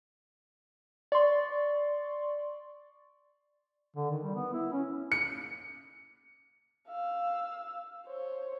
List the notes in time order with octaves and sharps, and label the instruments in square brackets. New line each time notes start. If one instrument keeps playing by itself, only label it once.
[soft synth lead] D5 [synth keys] C6 C#6
[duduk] D3
D#3
G3
B3
E4
C#4
[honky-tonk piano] C#7
[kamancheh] F5 E6
C5 C#5